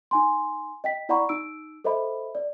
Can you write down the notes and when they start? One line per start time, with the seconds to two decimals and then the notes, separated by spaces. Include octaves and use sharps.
0.11 D#4 G#5 C6
0.84 D#5 G5 B6
1.09 E4 D5 F#5 A#5 B5 C#6
1.29 D#4 E6 D7
1.84 A4 C5 D#5 E5 B5
2.35 D5